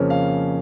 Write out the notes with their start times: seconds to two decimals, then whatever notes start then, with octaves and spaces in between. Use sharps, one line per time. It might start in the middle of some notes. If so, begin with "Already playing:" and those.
Already playing: F2 C#3 F3 A#3 C#4
0.10 F5